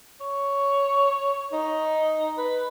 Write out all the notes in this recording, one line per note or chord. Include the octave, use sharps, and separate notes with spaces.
C#5
D#4
B4